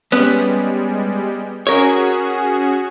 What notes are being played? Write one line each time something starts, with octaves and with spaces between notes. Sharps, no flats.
G3 G#3 B3 C#4
C#4 F#4 G#4 A#4 C#5